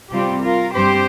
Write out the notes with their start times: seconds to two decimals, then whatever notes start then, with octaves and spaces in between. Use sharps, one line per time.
0.11 C3 G3 C4 F4 G4
0.43 F4 A#4
0.74 G2 G3 C4 G4 C5